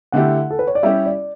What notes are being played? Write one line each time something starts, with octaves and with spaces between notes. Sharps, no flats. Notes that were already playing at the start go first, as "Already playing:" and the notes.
D3 A3 E4 G4 F#5
A4
B4
C#5
D5
G3 C#4 E4 G4 E5
D5